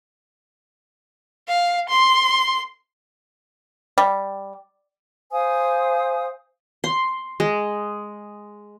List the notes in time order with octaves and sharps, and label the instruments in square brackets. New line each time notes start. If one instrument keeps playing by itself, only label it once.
[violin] F5
C6
[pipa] G3
[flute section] C5 F5 G#5 D#6
[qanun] C6
G#3